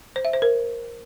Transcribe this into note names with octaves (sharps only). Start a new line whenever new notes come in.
C5
E5
C5
A#4